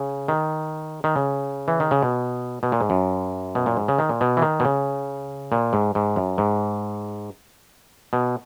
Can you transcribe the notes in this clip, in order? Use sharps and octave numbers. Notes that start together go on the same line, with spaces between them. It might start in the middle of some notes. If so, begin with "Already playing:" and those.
Already playing: C#3
D#3
D#3
C#3
E3
D#3
C#3
B2
B2
A#2
G#2
F#2
B2
A#2
G#2
C#3
D#3
A#2
B2
E3
D#3
B2
C#3
A#2
G#2
G#2
F#2
G#2
B2